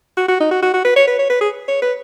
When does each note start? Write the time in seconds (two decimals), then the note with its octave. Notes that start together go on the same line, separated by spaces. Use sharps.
0.17 F#4
0.28 F#4
0.40 D#4
0.51 F#4
0.62 F#4
0.73 F#4
0.84 B4
0.96 C#5
1.07 B4
1.18 C#5
1.29 B4
1.41 G#4
1.68 C#5
1.82 B4